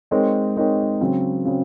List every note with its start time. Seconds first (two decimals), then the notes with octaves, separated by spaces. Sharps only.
0.11 G#3 C4 D#4 A#4 C#5
0.57 G#3 C4 D#4 A#4 C#5
1.01 C#3 F#3 C4
1.45 C#3 F#3 C4